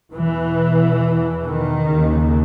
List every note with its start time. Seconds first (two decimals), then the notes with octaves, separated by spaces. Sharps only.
0.11 E2 B2 E3
1.45 D#3
1.90 D#2 C#3